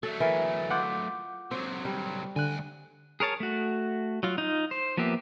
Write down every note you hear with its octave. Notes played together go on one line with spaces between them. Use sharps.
F#3 A3 A4
E3 A#4
F4 F#5 D6 G6
C3 F#3 F#4 C5
G3
D2 D3 G#5 F#6
G#4 A#4 C#5 A5
A3 F#4
F#3 F4
D#4 F4
C5
F3 A#3 B3 G4 E5